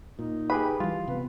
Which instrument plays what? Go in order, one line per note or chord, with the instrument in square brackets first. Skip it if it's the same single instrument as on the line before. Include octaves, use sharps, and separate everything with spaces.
[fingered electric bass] A#2 [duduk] D#4
[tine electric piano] G4 G#4 B4 [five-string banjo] B5
[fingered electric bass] E3 G3 [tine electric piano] F4
[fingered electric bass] C3 B3 [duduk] B4